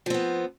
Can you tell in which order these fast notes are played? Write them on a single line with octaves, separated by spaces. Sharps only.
F3 C4 B3